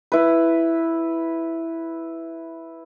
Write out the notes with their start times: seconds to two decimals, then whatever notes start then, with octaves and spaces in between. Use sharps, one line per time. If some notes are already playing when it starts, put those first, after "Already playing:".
0.12 E4 B4